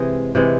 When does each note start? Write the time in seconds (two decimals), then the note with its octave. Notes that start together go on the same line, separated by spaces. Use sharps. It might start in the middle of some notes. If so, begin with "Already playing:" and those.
Already playing: C3 E3 G#3 D#5
0.35 C3 E3 G#3